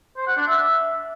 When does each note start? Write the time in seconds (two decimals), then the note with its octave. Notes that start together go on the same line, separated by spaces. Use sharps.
0.17 C5
0.27 F#5
0.37 D4
0.47 E5